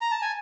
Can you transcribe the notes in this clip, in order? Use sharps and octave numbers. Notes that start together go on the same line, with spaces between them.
A#5
A5
G#5